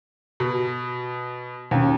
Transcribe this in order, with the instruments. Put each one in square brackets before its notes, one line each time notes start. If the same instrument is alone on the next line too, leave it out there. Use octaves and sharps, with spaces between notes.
[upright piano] B2
[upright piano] D#2 [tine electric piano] B2 C#4